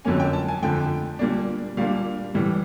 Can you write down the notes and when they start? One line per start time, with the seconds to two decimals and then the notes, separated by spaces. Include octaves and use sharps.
0.05 F2 D3 F#3 A#3 C#4 G#5
0.20 G5
0.33 A5
0.48 G#5
0.62 F2 D3 F3 A3 G5
1.19 A#2 G3 A#3 D4
1.77 A#2 G3 A#3 D4 F5
2.34 A2 E3 G3